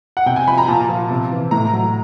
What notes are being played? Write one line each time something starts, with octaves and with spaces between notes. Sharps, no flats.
F#5
C3 G5
G#5
F3 B5
A#5
A#2 A5
F3
C3
E3
A2 A#5
F#3